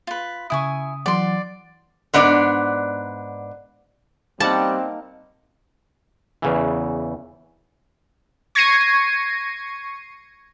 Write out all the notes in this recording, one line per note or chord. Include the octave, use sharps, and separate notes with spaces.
F4 B4
C#3 E4 G#5 C#6 D#6
E3 F#3 D5 F#5 C6
G#2 B3 D4 D5
G3 A#3 C4 D#4 F#5 A5
E2 C#3 E3
C#6 G#6 A#6 C7 C#7 D#7